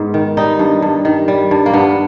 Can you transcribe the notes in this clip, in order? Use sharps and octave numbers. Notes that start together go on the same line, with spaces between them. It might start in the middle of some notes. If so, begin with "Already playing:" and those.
Already playing: G#2 B3
D#3
G3 D#4
G2
G2
D#3
G3
G2
A#3
G2 B3